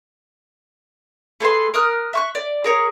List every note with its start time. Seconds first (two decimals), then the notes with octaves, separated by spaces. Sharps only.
1.40 A3 G#4 B4 C6
1.74 A#4 D#6 F6 F#6
2.13 E5 C#6 F#6
2.35 D5
2.64 G#4 A#4 C#5